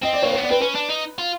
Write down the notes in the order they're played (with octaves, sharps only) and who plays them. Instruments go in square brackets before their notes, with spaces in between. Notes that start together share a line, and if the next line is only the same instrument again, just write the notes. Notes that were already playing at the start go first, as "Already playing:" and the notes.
[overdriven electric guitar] C4 [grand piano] D#5
[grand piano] D5
[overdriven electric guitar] A#3 [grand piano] C#5
[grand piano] C#5
[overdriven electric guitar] B3 [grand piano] D5
[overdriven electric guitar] C4 [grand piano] B4
[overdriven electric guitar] C#4 [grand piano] B4
[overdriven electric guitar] D4
D#4
F4